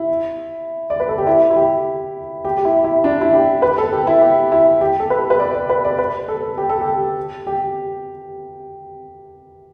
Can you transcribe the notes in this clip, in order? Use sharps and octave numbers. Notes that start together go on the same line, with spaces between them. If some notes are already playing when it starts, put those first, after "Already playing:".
Already playing: E4
D5
B4
A4
G4
E4
E4
G4
G4
G4
E4
E4
D4
E4
G4
B4
A4
G4
E4
G4
E4
G4
A4
B4
B4
D5
D5
B4
D5
B4
A4
G4
A4
G4
G4